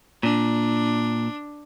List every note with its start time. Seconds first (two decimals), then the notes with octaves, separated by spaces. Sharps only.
0.23 A#2 D4